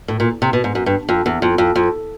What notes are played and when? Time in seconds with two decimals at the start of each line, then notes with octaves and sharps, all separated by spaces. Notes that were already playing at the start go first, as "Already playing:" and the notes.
0.08 A2
0.20 A#2
0.42 C3
0.53 B2
0.64 G#2
0.75 F#2
0.86 G2
1.09 F2
1.26 E2
1.42 F2
1.58 F2
1.76 F2